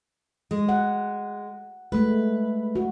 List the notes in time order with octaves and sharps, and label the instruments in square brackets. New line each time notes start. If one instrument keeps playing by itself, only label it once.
[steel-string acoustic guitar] G#3
[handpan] F#5
[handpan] G#3 A3 [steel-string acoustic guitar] B4
[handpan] F#4